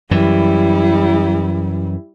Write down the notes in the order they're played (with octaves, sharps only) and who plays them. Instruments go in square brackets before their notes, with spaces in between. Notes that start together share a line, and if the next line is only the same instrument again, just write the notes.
[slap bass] F#2 E3 [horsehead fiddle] G3 E4